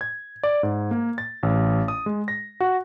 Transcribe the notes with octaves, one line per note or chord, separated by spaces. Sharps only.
G#6
D5
G#2
A#3
A6
A1
D#6
G#3
A#6
F#4